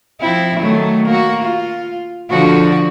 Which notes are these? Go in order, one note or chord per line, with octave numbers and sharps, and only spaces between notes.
F3 C4 E4
D#3 F#3 A3
A#3 F#4
F4
D3 F3 F#4